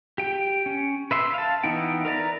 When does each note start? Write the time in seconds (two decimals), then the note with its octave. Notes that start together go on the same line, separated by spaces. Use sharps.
0.18 G4 G5
0.66 C#4
1.11 B4 E5 C6
1.34 F5 A5
1.64 E3 B3 D#4 E4 G5
2.05 A#4 B4 D5 A#5